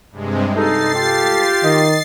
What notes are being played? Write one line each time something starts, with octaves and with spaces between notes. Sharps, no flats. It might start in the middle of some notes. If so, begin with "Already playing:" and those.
G2 C3 G#3
D#4 A4 A6 C7
F4 G4
D#3 D#5